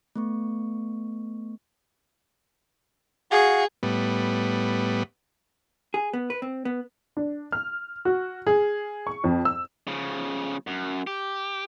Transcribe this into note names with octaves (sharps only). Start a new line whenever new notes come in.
A3 B3 C#6
F#4 G#4 F5 F#5
A2 G3 B3
G#4
B3
B4
C4
B3
D4
F6
F#4
G#4
C#6
F2
E6
C#3 F3
F#2
G4